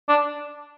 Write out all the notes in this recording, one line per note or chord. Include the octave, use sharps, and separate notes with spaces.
D4